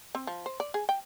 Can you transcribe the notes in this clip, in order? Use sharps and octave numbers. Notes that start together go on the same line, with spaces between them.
C4
F3
C5
D5
G#4
G5